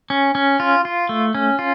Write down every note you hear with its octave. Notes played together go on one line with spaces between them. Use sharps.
C#4
C#4
F4
F4
A3
C#4
F4